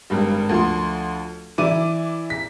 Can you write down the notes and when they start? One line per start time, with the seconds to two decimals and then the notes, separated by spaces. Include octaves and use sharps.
0.10 G#1 G2 G3
0.49 D2 F3 C6
1.58 E3 E4 D5 D6 D#7
2.30 B6